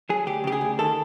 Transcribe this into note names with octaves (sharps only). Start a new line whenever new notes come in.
F#3 G#4
D2 G4
C#3 G4
G#4
D2
D#3 A4